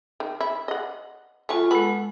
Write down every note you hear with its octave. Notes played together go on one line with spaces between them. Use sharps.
D#3
E4
D#5 F#5
F#3 A3 F4 G#5 C#6
G#3 B3 A4 F#5